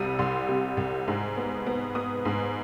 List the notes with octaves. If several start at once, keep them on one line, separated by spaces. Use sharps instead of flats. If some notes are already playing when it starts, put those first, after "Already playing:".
Already playing: C2 C3 G3
C2 C6
C3
C2
G#2
B3
B3
B3 D#6
G#2